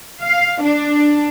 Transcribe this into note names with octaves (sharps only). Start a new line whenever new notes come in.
F5
D4